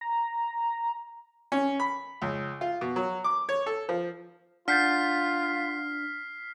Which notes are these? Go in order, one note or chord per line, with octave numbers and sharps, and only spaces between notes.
A#5
C#4
B5
C#2
F4
B2
F#3
D6
C#5
A4
F3
D4 F4 F#5 F6 G6 A6 B6 C7